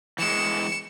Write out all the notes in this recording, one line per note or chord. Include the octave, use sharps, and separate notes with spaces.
E3 G#3 C#7 E7